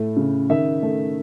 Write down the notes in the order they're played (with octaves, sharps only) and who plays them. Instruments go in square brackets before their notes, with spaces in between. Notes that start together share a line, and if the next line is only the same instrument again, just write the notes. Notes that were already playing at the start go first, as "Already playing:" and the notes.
Already playing: [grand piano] A2 A3
C#3
D#3 E5
A3